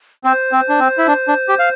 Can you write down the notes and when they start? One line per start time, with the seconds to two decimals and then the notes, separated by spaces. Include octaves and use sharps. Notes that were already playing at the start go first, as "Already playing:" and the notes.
0.24 C4 C5
0.52 C4
0.69 D4
0.80 C4
0.98 E4
1.07 D4
1.28 D4
1.48 G4
1.59 F5